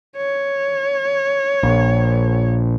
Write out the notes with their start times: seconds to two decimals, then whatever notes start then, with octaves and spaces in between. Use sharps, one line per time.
0.17 C#5
1.63 A#1